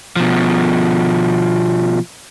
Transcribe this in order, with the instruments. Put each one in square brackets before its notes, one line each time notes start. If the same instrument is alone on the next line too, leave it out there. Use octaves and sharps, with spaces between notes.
[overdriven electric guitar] B2 F3